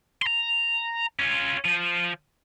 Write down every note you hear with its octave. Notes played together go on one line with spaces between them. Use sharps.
A#5 C6
C#4 F4
F3